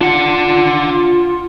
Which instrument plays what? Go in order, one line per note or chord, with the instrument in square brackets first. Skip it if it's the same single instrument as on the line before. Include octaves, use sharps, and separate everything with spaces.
[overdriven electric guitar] D4 F#5 [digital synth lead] F4